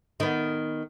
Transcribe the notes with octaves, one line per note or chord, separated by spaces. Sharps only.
D#3 B3